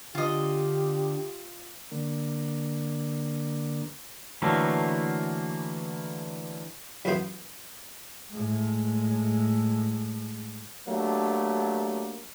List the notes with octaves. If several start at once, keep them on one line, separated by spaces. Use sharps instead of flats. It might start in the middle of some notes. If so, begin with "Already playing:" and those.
D3 F4 G4 D#5
D3 A#3
D3 E3 F#3 A3 A#3
B1 F#2 E3 B3 C5 F5
A2 G#3
F#3 A3 A#3 D4 G4